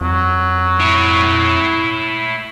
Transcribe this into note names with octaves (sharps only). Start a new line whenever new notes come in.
F2 F#3
E4 C#5